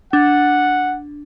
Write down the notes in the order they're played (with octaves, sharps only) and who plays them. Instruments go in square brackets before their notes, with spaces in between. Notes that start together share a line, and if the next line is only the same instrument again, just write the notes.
[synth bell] D4 [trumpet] F#5